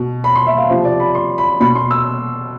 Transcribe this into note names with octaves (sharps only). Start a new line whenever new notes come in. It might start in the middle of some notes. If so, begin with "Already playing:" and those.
Already playing: B2
B5
C6
E5
F5
C3 F3 C5
D5
B5
C6
B5
B2 B5
C6
E6